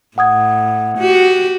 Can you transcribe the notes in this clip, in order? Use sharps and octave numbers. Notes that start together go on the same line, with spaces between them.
A2 F#5 D#6 G#6
F#4 G4